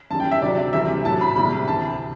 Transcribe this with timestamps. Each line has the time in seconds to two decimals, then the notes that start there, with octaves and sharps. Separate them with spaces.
0.10 F#2 E3 G3 A5
0.20 G5
0.31 E5
0.41 D2 C3 F#3 D5
0.73 D2 C3 E3 G3 E5
1.05 A2 F#3 A5
1.21 B5
1.36 C2 C3 G3 B5
1.67 D2 C3 E3 A5